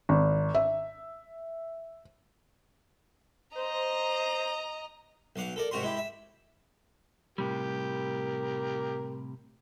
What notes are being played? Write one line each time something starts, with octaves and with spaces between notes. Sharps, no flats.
G#1
E5
C5 D#5 A#5
B1 F5 F#5 D6
A4 A#4 D5
G#2 C3 F#4 A#4 C6
G#3 E4 G4
E5
A2 C3 G3 G4 A#4